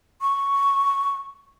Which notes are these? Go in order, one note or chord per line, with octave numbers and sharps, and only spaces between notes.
C#6